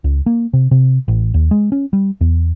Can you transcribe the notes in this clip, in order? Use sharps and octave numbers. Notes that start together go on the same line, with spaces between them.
C#2
A#3
C3
C3
A1
D#2
G#3
C#4
G3
E2